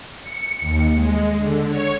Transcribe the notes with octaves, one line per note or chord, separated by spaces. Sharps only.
C#7
D#2
G#3
D3
C#5